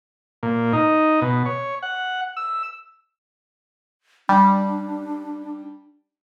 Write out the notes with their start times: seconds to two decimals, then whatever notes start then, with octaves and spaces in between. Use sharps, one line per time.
0.43 A#2
0.73 D#4
1.22 B2
1.46 C#5
1.82 F#5
2.37 E6
4.29 G3 D4